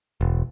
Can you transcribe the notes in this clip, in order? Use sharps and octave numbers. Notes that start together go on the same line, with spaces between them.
E1